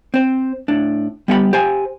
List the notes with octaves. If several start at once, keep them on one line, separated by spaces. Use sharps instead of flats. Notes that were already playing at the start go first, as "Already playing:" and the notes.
C4 C5
A2 D4
G3 B3 G4 F#5 B5
G4 C5 G#5